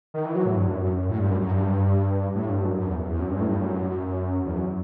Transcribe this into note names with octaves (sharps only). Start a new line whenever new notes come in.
D#3
E3
F#3
A2
G2
F#2
A2
G2
F#2
F#2
G2
A2
G2
F#2
F#2
E2
E2
F#2
G2
A2
G2
F#2
E2
F#2